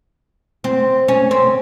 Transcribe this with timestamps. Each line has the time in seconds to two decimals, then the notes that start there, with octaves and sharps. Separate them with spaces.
0.64 C4
1.08 C#4
1.31 C4